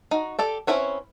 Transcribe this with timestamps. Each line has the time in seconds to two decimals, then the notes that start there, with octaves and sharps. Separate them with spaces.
0.11 D#4 F#4
0.39 G4 A4 D5
0.67 C4 C#4 E4 B4 C#5